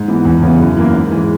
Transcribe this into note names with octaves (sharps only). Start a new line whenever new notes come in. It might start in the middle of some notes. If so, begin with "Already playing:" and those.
Already playing: G#2
E3 B3
E2
C#3 E3 B3
F#2
E3 A#3 E4
G#2
E3 G#3